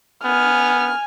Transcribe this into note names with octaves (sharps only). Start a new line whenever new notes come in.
B3 G#5 F6